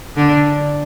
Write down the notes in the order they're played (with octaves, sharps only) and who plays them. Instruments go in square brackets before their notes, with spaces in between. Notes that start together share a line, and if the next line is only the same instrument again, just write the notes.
[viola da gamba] D3 D4